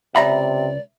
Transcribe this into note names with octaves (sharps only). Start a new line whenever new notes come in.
C#2 C3 D5 E5 A#5 B5